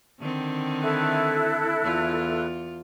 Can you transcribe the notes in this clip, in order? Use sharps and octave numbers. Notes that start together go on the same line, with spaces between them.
D3 D#3 C4
E4 A4 F#6
E2 F4